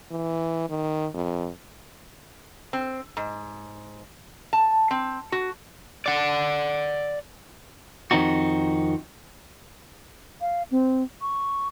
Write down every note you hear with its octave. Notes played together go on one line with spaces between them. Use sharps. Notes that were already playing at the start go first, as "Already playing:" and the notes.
E3
D#3
F2
C4
G#2
A5
C4
F#4
D5 F#5
F2 D#3 C4 D#4 F#4
F5
C4
C#6